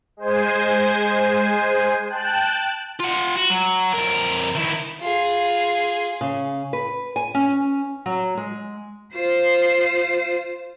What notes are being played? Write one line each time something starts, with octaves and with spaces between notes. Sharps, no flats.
G#3 C5 G#5
G5 A5 F#6
F4 F#5
F#4
F#3
F2 A#4
D#3 E4
F4 G#4
C#3
B4
G#5
C#4
F#3
G#3
F4 C5